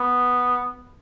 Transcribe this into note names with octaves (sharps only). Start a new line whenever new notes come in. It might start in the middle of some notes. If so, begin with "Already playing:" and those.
Already playing: B3